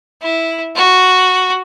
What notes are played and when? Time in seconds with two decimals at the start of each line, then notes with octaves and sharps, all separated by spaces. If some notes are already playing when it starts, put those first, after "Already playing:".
0.22 E4
0.76 F#4